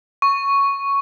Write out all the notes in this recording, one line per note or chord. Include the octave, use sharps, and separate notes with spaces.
C#6